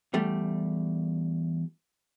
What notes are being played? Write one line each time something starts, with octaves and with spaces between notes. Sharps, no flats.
E2 G3 A3